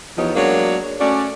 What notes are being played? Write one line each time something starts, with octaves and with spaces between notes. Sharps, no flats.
E2 F3 B3 D#4 G4 C#5
F#3 G#3 A#3 B3 D4 C#5
A3 C#4 F#4 D5